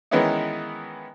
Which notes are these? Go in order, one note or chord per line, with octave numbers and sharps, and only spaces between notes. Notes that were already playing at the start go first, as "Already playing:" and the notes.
D#3 E3 G#3 B3 C#4 D#4